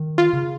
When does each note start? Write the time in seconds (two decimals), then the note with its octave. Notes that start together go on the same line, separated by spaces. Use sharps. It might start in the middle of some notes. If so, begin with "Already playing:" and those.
Already playing: D#3
0.18 F4
0.33 C#3